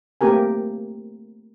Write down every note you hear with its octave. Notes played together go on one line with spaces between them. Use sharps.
A3 A#3 C4 G4 A#4 G#5